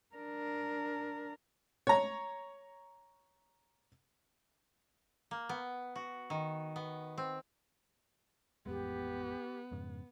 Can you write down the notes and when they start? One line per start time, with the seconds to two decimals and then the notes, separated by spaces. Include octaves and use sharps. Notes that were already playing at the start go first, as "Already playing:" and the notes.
0.15 D4 A#4
1.87 C#5 A#5
5.31 A#3
5.49 B3
5.96 F#4
6.30 D#3
6.76 B3
7.18 C4
8.66 A1 F2 G#3 B3 G4
9.72 F2 G#2 C#3